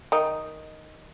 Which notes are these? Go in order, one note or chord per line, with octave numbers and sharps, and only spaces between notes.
D#3 D#4